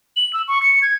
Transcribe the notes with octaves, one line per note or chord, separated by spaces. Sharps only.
F#7
E6
C#6
C#7
G#6